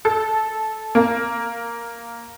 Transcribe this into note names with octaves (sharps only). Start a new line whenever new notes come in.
A4
A#3